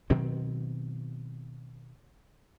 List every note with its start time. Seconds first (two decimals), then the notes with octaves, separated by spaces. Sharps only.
0.10 B2 D#3 F#3 C4